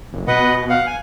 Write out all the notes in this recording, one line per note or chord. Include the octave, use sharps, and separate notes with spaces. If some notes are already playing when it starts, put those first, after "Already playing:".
F#1
B2 B4 D#5 F#5
F5 F#5
G#5